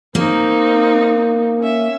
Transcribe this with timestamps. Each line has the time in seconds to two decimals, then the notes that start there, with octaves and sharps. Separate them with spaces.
0.15 A#3 C4 D#4
1.60 C#4 E5